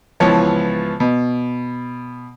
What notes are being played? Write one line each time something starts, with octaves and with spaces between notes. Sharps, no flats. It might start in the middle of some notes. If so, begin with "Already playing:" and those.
C#2 E3 F3 B3 C#5 A5
B2